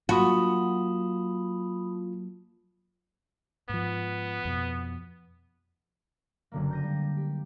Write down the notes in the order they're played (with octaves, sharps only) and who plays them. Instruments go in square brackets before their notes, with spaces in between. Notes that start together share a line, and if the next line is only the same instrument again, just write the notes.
[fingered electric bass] F#3 A#3 [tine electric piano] F4 [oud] F#4 [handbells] A5 B5 D#6
[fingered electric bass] G#2 F3 [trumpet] B3
[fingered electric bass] F2 B2
[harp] F#1 D3 A#3
G6 A#6 D#7
G3
G4